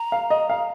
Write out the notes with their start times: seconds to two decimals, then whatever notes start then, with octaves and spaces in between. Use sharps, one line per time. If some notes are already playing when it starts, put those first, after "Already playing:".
Already playing: A#5
0.12 F5
0.30 D#5
0.50 F5